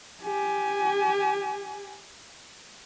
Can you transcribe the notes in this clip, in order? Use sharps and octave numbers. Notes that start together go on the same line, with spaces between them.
G4 G#5